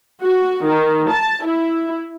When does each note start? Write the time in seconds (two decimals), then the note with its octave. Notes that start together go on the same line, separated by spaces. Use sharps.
0.23 F#4
0.64 D#3
1.09 A5
1.45 E4